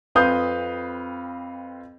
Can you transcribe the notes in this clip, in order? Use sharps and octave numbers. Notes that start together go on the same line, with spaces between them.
F2 C4 B4 F5 D#6 G6